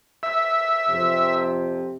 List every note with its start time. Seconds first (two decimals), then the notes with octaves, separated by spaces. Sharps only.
0.23 E5
0.90 F2 C3